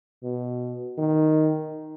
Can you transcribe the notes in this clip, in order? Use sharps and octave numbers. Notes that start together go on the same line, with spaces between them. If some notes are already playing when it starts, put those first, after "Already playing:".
B2
D#3